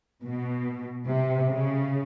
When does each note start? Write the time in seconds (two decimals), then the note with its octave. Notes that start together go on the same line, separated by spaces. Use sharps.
0.24 B2
1.08 C3
1.49 C#3